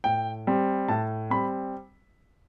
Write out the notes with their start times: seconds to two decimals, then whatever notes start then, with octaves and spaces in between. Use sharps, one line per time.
0.04 A2 G5
0.47 G3 C4
0.88 A2 A5
1.30 G3 C4 B5